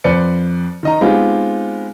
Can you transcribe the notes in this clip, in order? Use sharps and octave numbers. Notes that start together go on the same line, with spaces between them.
F2 B4 C5 D5 C#7
D#3 D#5 A#5
G#3 B3 C4 D#4 F4 G4